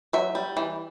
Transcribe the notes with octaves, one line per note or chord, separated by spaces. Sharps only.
F#3 E5
G3
E3